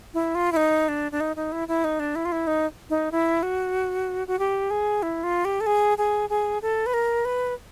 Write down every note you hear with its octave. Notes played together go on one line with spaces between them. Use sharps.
E4
F4
E4
D#4
D4
D4
D#4
D#4
E4
E4
D#4
D4
E4
F4
E4
D#4
D#4
E4
F#4
F#4
G4
G#4
E4
F4
G4
A4
G#4
G#4
G#4
A4
B4
A#4
B4